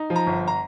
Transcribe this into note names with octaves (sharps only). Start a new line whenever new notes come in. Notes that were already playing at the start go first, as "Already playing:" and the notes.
Already playing: D#4
F3
A#5
G1
A#5